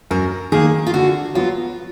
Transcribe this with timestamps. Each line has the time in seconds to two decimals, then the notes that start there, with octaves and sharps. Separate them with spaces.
0.11 F#2 A#4
0.52 D#3 A#3 G#4
0.86 F4
0.94 D3 F#4
1.35 F#3 B3 F4